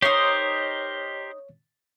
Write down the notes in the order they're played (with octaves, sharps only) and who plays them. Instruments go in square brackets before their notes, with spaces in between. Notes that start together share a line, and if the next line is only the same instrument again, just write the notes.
[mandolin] D#4 C6 [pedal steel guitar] G4 A#4 C5 [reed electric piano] C#5